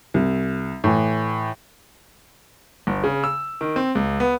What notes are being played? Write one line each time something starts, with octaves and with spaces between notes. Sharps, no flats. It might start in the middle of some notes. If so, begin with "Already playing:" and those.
C2
A2 E3
G1
C#3
E6
D#3
C4
C#2
B3